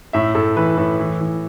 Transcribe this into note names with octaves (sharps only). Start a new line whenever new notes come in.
A2 E5
A2 A4
E3 B4
A2 A4
E3
E3